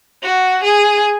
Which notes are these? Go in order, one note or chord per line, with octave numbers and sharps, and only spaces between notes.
F#4
G#4